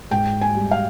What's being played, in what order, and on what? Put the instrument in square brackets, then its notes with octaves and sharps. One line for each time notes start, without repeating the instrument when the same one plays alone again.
[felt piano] G#2 G5
G#5
G3
F5